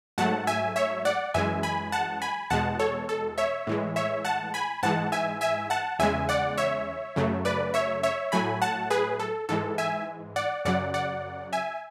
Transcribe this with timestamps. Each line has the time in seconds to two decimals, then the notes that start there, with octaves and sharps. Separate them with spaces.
0.18 G#2 F#3 A3 F#5 A5
0.47 E5 G#5
0.76 C#5 E5
1.05 D5 F#5
1.34 F#2 E3 G#3 E5 G#5
1.63 G#5 B5
1.92 F#5 A5
2.22 G#5 B5
2.50 E2 B2 G#3 F#5 A5
2.79 A4 C#5
3.09 A4
3.38 C#5 E5
3.67 A2 E3 G#3
3.96 C#5 E5
4.25 F#5 A5
4.54 G#5 B5
4.83 G#2 E3 G#3 F#5 A5
5.12 E5 G#5
5.41 E5 G#5
5.70 F#5 A5
5.99 E2 C#3 G#3 E5 G#5
6.29 D5 F#5
6.58 C#5 E5
7.16 F#2 C#3 F#3 A3
7.45 B4 D5
7.74 C#5 E5
8.03 C#5 E5
8.32 A2 F#3 A3 G#5 B5
8.62 F#5 A5
8.90 G#4 B4
9.20 A4
9.49 G#2 E3 G#3 A4
9.78 E5 G#5
10.36 D5 F#5
10.65 F#2 C#3 F#3 D5 F#5
10.94 D5 F#5
11.53 E5 G#5